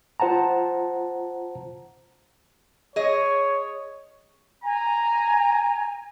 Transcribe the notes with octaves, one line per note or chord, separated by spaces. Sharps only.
F4 C5 F#5 A5 A#5
G#4 C#5 D#5
G#5 A#5